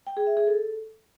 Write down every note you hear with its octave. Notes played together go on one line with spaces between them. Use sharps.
G5
G#4
E5
G#4
A4